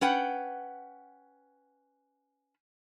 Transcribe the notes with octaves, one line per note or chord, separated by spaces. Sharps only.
C#4 B4 F#5 G5